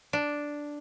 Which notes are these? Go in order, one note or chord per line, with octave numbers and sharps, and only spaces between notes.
D4